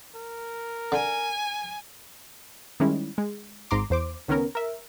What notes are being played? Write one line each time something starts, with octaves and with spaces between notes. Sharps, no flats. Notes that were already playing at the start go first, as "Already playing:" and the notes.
A#4
D3 G#5
D#3 G3 G#3 C#4 E4
G#3
G#1 G#2 A#5 C6 D6
E2 C5 D6
C#2 D#3 B3 C#4 A#4
A#4 E5